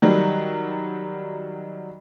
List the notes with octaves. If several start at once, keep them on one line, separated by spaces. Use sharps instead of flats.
D#3 F#3 G3